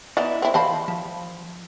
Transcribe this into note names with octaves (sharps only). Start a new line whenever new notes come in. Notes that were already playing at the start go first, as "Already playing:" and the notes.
E3 B3 D#4 E4 D5
C4 E4
E3 C5 F5 A5 B5
F3